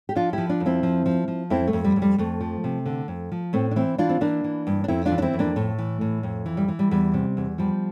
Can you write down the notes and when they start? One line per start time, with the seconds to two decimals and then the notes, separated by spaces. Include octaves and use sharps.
0.09 G4
0.15 F3 D4 F4
0.33 F3 E4 G4
0.49 D4 F4
0.60 F2
0.66 C4 E4
0.83 F3
1.06 F3
1.28 F3
1.50 F2 C4 E4
1.67 A3
1.73 F2
1.84 G3
1.96 F2
2.02 G3
2.18 F2 A3
2.41 F3
2.64 C3
2.86 D3
3.08 F2
3.32 F3
3.53 A2 A3 C4
3.71 D4
3.76 E3 C4 E4
3.98 E3 D4 F4
4.09 C4
4.21 E3 A#3 D4
4.44 E3
4.67 G2
4.84 D4
4.88 F2 C4 E4
5.06 D4 F4
5.12 E3
5.18 D4
5.22 C4 E4
5.33 F2
5.39 A#3 D4
5.56 A2 A3
5.78 E3
6.01 A2
6.23 F2
6.46 E3
6.57 G3
6.68 E3
6.79 G3
6.91 E2 G3
7.14 C3
7.37 E2
7.58 F3 G3